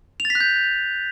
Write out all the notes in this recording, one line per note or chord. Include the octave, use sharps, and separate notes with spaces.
F7
A6
B6
F#6
G6